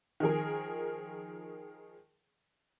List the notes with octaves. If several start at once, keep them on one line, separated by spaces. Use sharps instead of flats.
D#3 F3 G#4 A#4